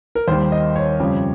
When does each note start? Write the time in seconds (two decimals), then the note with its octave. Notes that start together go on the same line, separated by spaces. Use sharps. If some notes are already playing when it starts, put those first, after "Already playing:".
0.15 A#4
0.28 D#2 D#3 G3 C5
0.52 D#5
0.76 C#5
1.00 F2 C#3 G3